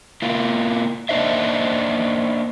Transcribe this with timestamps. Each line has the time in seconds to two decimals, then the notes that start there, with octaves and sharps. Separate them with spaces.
0.22 A#3 E4 F4
1.09 A#3 D4 D#4 C5 D#5 E5